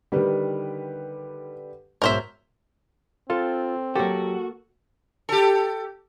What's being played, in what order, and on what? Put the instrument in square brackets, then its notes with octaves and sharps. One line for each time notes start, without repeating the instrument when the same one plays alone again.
[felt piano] D3 G4 B4 [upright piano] D#3 G3
[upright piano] B1 G#2 C#5 [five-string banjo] A#4 C5 E5
[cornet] C4 [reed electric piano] F4 [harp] A4
[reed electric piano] F#3 G4 [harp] A#3 A4 [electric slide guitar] F#4
[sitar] G4 A4